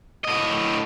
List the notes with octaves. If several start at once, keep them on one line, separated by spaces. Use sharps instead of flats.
A2 D#5